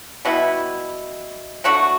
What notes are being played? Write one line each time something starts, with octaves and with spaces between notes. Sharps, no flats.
B2 G3 B3 E4
F#3 A3 D4 F#4